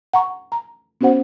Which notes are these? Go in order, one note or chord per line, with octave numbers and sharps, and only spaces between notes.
F#5 A#5 C#6
A#5
B3 C#4 F#4 C5 F#5